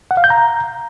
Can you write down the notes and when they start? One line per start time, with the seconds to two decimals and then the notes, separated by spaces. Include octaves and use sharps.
0.11 F#5
0.17 F5
0.24 G6
0.30 A#5